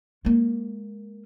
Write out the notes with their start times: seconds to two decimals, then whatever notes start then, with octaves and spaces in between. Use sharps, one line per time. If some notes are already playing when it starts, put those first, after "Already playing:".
0.25 G#3 A#3